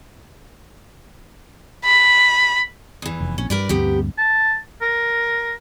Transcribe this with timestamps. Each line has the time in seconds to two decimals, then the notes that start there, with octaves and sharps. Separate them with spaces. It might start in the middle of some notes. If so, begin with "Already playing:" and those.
1.85 B5
3.02 E2 E3
3.21 F1
3.38 A#1 C#4
3.50 G2 G3 A#4 B4 D5
3.69 D2 G2 C3 B3 G4
4.18 A5
4.81 A#4